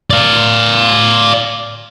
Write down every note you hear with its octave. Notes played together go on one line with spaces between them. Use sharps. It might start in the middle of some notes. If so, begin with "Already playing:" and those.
D5 F5